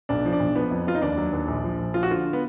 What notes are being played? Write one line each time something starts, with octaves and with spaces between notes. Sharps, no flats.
B1 D4
F3
D4
B1
F3 B3
F2
F2 F4
D#4
D#2 D4
F#3
D#2
A#1
F3
A#1
F3 F4
F#4
D3 F4
B3